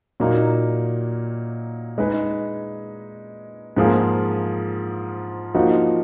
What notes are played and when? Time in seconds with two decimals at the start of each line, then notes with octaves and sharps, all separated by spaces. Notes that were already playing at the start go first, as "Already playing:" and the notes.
0.20 A#2 F#3 A#3 D#4
1.98 G#3 D#4 G#4 B4
3.77 G#2 F3 A#3 F4 G#4
5.55 F3 A#3 D#4 F#4